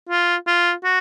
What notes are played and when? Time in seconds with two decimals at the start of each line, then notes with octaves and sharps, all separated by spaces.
0.10 F4
0.47 F4
0.84 F#4